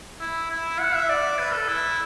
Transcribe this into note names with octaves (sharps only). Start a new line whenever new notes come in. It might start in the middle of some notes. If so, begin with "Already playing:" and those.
E4
E4
F#5
E5
D5
B4
A4
E4